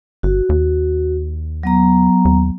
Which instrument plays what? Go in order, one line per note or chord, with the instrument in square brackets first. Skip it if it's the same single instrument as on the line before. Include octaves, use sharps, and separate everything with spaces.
[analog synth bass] G1 [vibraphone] F#4
[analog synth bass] D#2
[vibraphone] F#3 B3 A#5
[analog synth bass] D#2